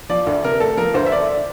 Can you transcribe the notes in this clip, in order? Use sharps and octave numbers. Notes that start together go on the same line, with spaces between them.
F3 D5
D2
C3 A#4
A3 A4
F3 A#4
D2 C5
E5
D3 D5